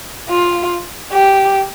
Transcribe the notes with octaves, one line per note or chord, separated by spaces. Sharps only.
F4
G4